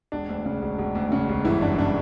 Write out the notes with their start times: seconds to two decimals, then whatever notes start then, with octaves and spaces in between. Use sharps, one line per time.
0.12 E1 D4
0.29 D2
0.45 C#3
0.62 E1
0.78 E1
0.95 D2
1.12 C#3
1.29 E1
1.45 G1 E3 E4
1.62 F#2 D4
1.78 C#3 D4